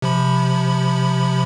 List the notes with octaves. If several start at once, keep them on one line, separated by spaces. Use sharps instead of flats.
C3 F3 B5